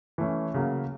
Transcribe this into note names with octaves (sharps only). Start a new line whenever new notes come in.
E3 A3 C#4
C#3 F#3 A#3